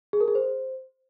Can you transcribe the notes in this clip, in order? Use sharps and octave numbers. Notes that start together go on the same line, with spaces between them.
G#4
A#4
G#4
C5